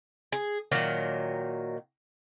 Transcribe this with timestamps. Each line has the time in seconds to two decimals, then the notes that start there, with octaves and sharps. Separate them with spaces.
0.32 G#4
0.72 A#2 D#3 F#3